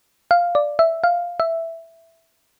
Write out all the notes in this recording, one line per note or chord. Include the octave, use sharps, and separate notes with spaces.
F5
D5
E5
F5
E5